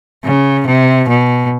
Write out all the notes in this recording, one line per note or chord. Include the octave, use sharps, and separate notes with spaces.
C#3
C3
B2